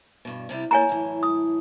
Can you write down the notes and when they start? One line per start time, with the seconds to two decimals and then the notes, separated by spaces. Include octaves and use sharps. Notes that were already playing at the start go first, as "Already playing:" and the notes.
0.25 G2 B2
0.49 C3 G3 E4
0.71 A2 A3 A#3 C#5 G#5 A#5
0.87 F#2 A2 E3
1.23 D#6